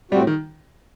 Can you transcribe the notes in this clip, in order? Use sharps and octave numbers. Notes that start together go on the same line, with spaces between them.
A2 G3 A3 C4 F#4
D#3